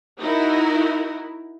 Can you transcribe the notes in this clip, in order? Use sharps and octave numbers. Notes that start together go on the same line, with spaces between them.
D#4 E4 F#4 A#4